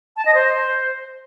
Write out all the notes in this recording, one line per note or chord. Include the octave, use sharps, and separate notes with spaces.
A5
D#5
C5